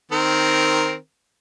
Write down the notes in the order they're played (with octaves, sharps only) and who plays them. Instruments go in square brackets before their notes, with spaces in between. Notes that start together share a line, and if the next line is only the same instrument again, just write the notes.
[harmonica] D#3 C4 A#4